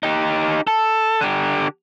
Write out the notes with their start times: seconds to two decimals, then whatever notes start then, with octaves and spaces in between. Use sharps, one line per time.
0.03 D#4 G4
0.67 A4
1.21 D3 G4